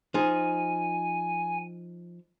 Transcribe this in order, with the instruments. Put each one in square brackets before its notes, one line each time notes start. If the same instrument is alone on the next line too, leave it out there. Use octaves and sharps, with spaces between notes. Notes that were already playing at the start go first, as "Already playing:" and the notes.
[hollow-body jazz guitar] F3 D#4 G#4 [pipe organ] G#5